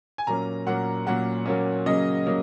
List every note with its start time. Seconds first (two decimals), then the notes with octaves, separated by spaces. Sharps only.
0.18 G#5
0.27 A#2 F#3 A#3 C#4 A#5
0.67 A#2 F#3 A#3 C#4 F#5
1.06 A#2 F#3 A#3 C#4 F#5
1.46 A#2 F#3 A#3 C#4
1.86 C#3 F#3 A#3 C#4 D#5
2.26 C#3 F#3 A#3